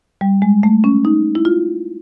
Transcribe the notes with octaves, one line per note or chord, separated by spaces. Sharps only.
G3
G#3
A3
C#4
D#4
E4
F4